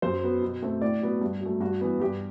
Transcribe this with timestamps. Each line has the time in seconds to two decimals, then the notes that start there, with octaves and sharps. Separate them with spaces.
0.02 F#2 C5
0.23 F#3 B3
0.42 B2
0.62 A3 C4
0.81 A2 D5
1.01 F#3 B3
1.22 G2
1.41 F#3 A3
1.61 G2 F#4
1.81 E3 B3
2.00 G2 G4